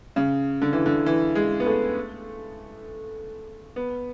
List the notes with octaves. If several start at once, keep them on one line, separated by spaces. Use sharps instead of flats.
C#3
D3
E3
D3
E3
G#3
B3
A3
B3